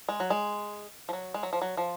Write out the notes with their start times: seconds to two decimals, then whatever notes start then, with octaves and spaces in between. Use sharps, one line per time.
0.09 G#3
0.20 F#3
0.30 G#3
1.09 F3
1.13 F#3
1.34 G#3
1.43 F#3
1.53 F3
1.62 F#3
1.77 F3